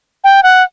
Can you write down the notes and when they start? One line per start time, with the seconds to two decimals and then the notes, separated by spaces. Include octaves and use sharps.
0.24 G5
0.43 F#5